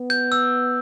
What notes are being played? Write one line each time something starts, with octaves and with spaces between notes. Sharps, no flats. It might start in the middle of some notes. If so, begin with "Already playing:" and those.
Already playing: B3
G6
E6